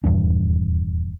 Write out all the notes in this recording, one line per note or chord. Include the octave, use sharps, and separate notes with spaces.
D#1 E2 G2 D4